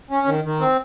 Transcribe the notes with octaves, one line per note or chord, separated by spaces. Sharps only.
C#4
D#3
D#3
C4